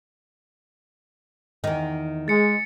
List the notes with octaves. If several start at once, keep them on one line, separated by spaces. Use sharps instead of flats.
E2 D#3
G#3 A6 C#7